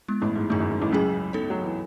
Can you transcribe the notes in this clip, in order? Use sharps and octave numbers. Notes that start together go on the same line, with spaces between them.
G#3 B3 E4
A1 A2
G#2
F#2 D#3 A3 D#4 G#4
F#2
G#2
A1 A2
C#2 C#3 F#3 C#4 G#4
B3 D#4 A4 C#5
F#3
E3